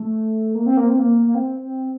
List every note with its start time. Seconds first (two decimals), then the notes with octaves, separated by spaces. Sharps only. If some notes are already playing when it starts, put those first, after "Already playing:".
Already playing: A3
0.55 A#3
0.66 C4
0.77 A#3
0.88 C4
0.99 A#3
1.26 A#3
1.35 C4
1.61 C4